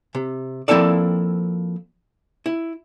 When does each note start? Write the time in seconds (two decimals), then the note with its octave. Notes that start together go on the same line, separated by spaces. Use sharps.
0.15 C3
0.68 F3 A#3 C4 E4 A4 D5
2.46 E4